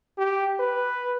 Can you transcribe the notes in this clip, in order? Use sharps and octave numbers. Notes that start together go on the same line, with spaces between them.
G4
B4